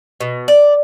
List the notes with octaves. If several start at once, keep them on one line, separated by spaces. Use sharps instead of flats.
B2
D5